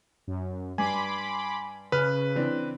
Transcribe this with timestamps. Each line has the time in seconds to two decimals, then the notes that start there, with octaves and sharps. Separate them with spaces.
0.28 F#2
0.78 G2 G#5 B5 C6 D6
1.92 C#3 B4 F6
2.35 E3 C4 D4